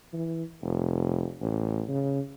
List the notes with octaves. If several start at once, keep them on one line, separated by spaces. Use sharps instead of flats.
E3
F1
A1
C#3